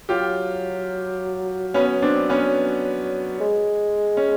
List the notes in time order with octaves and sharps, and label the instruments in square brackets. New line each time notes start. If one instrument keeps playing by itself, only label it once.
[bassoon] F#3 [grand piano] F4 G4
[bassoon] F#3 [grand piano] B3 C#4
[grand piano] C4 D4
B3 C#4
[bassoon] G#3
[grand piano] C#4